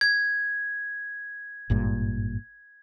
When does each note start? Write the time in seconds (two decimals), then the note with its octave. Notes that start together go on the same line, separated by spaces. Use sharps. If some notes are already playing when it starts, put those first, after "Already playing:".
0.01 G#6
1.70 G#1 G2 A#2